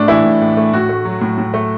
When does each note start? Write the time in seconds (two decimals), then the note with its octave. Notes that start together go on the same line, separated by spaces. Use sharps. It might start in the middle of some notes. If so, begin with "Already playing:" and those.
Already playing: A2 A3 D4
0.08 E3 E4
0.24 A2
0.41 A2
0.57 A3
0.73 A2 F#4
0.89 A3
1.05 F#3
1.21 A2
1.38 A2
1.54 A3